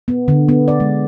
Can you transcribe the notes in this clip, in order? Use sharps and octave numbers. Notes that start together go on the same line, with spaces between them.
B3
D3
B3
D5
G#3